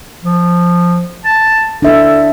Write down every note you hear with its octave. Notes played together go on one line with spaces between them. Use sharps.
F3
A5
D4 A4 E5